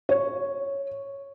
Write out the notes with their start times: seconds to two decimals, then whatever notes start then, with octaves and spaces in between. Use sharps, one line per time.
0.09 C#5